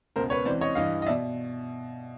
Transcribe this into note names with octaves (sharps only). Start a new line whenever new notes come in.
C#2 B2 A#4 C5
B4 C#5
C#2 C3 E3 C5 D5
C#5 D#5
G2 E3 D#5 F5
D#5
D5 E5
B2